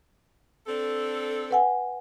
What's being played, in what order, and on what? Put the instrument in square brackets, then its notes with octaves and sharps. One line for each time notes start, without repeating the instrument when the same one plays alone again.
[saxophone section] C4 D4 A4
[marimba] B4 F#5 G#5